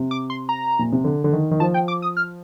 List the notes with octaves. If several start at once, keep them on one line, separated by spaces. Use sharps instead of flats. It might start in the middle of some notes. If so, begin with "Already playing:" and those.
Already playing: C3
D6
C6
A#5
A#2
C3
D3
D3
D#3
D#3
F3 A5
G5
D6
D#6
F6